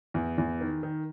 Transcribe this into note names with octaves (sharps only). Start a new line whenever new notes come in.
E2
E2
D#3
D#3